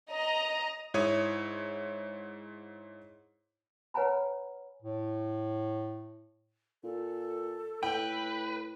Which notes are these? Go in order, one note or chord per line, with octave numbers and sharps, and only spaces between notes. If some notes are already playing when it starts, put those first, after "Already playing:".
D#5 A#5
G#2 E4 C#5 D#6 D#7
B4 C#5 F#5 G#5 A#5 B5
A2
A#2 A4
A2 B4 G5